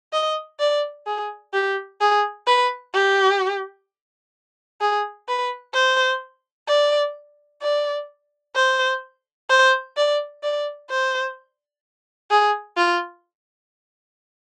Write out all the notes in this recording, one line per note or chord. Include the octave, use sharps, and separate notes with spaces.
D#5
D5
G#4
G4
G#4
B4
G4
G#4
B4
C5
D5
D5
C5
C5
D5
D5
C5
G#4
F4